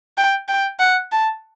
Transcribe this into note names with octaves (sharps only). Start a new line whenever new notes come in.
G5
G5
F#5
A5